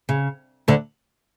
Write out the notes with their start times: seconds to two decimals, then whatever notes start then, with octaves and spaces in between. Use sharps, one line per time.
0.09 C#3
0.68 D2 D3